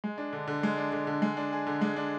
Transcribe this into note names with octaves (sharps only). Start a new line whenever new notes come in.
G#3
D4
D3
D3
G#3
D4
D3
D3
G#3
D4
G#4
D3
G#3
D4